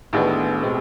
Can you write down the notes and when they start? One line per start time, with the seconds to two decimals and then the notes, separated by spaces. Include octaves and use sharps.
0.13 A1 A2 D#3 G#3 B3 D4
0.63 B2 G#3 C4